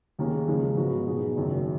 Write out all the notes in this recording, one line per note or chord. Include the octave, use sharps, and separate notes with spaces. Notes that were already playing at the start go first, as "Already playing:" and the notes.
D#2 D#3 A#3 C#4 G#4
C#2 C#3 F3 G#3 C#4
G#2 F3 B3 F#4
B2 F#3 B3 D#4 G#4
F#1 F#2 D#3 F#3